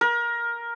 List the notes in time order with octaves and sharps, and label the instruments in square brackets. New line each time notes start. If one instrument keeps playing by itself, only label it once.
[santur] A#4